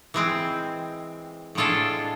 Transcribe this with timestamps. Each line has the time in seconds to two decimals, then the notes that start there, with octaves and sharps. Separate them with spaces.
0.14 E3 G#3 C4
1.55 A2 G#3 D4 F4 A4